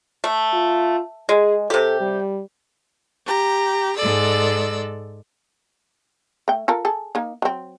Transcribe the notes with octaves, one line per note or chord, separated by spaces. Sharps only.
A3
F4
G#3 G#4
C3 G4 A4
G3
G4 A#5
G#2 G#3 A4 D5 E6
A3 G5
F4 A4 A#4
G#4 A4
A#3 D#4
F#3 C4